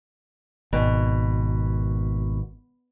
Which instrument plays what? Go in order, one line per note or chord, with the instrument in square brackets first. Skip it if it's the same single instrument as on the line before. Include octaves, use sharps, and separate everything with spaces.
[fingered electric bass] G#1 [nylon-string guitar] B2